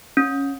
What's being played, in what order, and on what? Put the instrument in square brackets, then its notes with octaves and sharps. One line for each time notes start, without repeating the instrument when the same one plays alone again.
[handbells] C#4